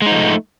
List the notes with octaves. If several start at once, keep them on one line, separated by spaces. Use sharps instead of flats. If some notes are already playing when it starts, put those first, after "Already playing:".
F3 G#3 A3 D#4